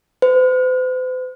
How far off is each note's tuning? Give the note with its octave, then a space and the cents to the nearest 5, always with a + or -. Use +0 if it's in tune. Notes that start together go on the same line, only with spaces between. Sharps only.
C5 -45